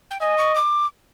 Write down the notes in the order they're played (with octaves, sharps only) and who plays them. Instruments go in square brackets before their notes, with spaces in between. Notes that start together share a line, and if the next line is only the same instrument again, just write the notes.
[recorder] G5
[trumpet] D#5 [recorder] G#5
[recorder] C#6
D6